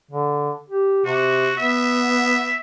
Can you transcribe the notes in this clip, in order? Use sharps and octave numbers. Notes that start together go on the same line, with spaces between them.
D3
G4
C3 F#4
B3 E5